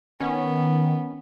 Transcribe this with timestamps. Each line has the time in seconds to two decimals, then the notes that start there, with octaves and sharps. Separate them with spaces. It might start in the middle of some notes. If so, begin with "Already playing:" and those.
0.20 D#3 B3 C#4